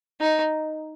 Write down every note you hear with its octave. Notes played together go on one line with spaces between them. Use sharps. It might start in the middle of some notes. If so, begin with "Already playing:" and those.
D#4